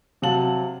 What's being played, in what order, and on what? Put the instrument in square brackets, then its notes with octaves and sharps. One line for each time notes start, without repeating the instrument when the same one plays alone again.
[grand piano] C3 F#3 F5 A5 F#7